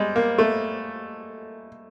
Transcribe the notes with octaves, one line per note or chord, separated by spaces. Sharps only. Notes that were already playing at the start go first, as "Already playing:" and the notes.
Already playing: G3 G#3
A#3
A3